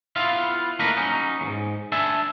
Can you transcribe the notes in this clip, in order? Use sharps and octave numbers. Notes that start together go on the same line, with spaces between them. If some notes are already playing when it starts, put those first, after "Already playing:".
B3 E4 F4 F5
D3 A3 A#3 D#4 A#4 B4
F#3 C#4 D#4
E2 G#2
D4 E5 G#5 A5